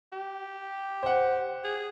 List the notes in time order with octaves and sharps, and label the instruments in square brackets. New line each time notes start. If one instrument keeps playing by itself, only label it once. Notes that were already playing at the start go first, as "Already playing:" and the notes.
[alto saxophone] G4
[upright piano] C5 F#5
[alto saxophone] G#4